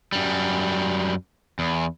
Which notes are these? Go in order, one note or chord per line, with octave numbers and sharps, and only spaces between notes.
F#2 G3
E2